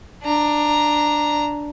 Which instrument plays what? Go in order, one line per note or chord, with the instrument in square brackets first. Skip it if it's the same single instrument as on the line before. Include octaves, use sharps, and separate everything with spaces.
[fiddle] D4 A#5